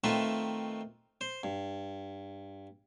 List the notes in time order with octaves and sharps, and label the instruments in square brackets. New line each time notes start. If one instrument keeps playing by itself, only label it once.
[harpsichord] D#3 A3 C4 F4 B4 E5
C5
G2